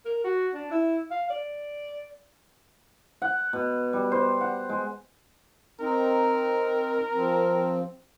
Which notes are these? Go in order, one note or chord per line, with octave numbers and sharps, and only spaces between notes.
A#4
F#4
D4
E4
F5
D5
F#5
B2
G3
C5
F#5
G#3
C4 D#4 A#4
F3 C4